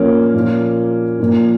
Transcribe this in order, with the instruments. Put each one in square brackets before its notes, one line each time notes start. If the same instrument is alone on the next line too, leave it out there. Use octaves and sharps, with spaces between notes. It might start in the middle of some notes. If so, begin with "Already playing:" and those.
Already playing: [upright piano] A#2 F3 A#3 C#4
A#2 F3
A#2 F3